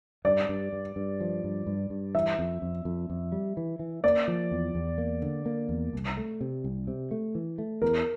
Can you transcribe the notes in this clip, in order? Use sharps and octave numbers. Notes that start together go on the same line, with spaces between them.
G2 D5
G2
G2
G2
F3
G2
G2
G2
E3 E5
F2
F2
F2
F2
G3
E3
E3
A#3 D5
F3
E2
E2
A#3
D3
A#3
E2
C2
A3
C3
C2
C3
A3
E3
A3
E2 A#4